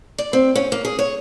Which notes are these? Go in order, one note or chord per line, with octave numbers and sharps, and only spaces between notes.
D5
C4
C#4
A#3
G#4
C#5